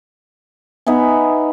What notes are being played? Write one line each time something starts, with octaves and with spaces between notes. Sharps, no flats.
B3 D#4 E5 G#5